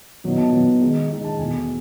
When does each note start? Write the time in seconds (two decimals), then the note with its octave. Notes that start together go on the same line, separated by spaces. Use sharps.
0.24 B2 F#3 B3 D#4
0.38 A5
0.53 B2 F#3 B3 D#4
0.81 D#3 G#3 D#4
1.10 D#3 G#3 D#4
1.24 A5
1.38 E2 B2 A3 G#5